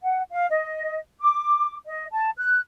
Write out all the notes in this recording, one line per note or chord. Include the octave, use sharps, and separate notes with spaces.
F#5
F5
D#5
D6
D#5
A5
F#6